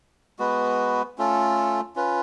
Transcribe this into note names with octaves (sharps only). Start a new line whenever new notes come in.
G#3 B3 F#4 B4
A3 C#4 F4 A4
C#4 F4 B4